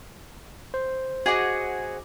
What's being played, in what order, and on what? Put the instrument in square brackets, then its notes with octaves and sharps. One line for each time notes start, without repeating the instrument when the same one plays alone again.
[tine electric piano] C5
[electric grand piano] F#4 D#5 D6 [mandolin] G#4 F#5